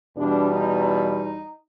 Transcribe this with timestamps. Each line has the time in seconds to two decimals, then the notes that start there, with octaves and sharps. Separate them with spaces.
0.16 E2 B2 G3 D4
0.48 D#4
0.79 D#4